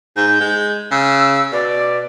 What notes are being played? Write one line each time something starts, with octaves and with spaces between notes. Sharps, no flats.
G#2 G6
G#3
C#3 E6
B2 D5